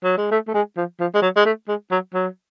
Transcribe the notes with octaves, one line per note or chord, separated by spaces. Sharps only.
F#3
G#3
A3
A3
G#3
F3
F3
G#3
F#3
G#3
A3
G#3
F#3
F#3